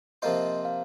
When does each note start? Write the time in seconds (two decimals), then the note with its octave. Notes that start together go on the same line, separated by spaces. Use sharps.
0.22 C3 F3 A#3 F4 C5 D#5
0.65 F5